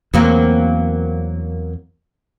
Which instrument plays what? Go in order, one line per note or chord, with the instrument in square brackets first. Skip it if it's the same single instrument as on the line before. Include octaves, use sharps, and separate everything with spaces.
[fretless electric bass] E2 [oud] F#3 A#3 C4